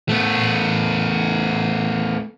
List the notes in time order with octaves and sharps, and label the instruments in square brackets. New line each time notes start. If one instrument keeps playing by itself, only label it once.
[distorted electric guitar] A3 B3